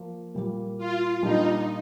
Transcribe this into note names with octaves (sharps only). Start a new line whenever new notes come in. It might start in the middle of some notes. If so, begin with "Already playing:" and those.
Already playing: F3 A#3
A#2 G3 A#3
F4
A#2 G3 D4 D#4